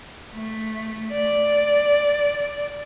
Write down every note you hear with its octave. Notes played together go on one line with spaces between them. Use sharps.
A3
D5